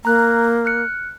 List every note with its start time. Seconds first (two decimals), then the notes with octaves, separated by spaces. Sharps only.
0.05 A#3 A#5 F#6
0.65 F6 F#6 C#7